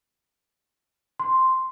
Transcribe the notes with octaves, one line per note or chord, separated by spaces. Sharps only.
C6